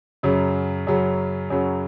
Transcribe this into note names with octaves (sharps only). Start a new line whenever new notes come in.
F#2 C#3 F#3
F#2 C#3 F#3
F#2 C#3 F#3